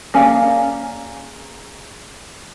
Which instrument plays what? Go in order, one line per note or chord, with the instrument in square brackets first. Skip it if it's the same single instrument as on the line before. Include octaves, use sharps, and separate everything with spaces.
[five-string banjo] A#3 C#4 G#4 D5 F5